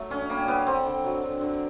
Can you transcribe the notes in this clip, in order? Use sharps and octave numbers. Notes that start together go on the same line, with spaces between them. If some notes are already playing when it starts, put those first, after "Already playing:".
Already playing: F#3 A3
D3 C#4
G3 A#3
G3 B3
D3 C4
D3
F#3
D3
D3